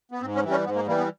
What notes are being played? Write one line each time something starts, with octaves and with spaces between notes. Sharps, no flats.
B3
G#2 C4
C#4
E3 G3
C#4
G#2 B3
A#3
E3 G3 A#3
B3